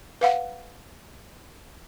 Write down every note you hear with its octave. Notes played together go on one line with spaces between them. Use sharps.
B4 F5 F#5